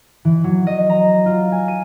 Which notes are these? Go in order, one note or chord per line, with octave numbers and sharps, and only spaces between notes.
E3
F#3
D#5
A#5
F4
G#5
D#7